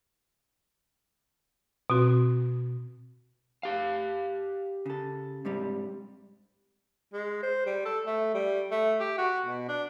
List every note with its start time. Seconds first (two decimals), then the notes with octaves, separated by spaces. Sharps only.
1.90 B2 C4 F#4
3.63 G4 F5
4.86 C#3 A4
5.45 G#2 C3 G3
7.13 G#3
7.43 C5
7.66 G3
7.85 A4
8.06 A3
8.34 G3
8.71 A3
9.00 G4
9.18 F#4
9.46 B2
9.69 D4